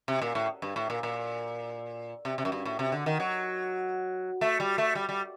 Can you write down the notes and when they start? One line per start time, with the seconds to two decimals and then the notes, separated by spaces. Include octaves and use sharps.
0.08 C3
0.22 A#2
0.35 A2
0.62 G2
0.76 A2
0.90 A#2
1.03 A#2
2.25 C3
2.38 C3
2.45 F#2
2.52 G2
2.65 A2
2.79 C3
2.92 D3
3.06 D#3
3.20 F#3
4.41 A3
4.60 G3
4.78 A3
4.95 G3
5.09 G3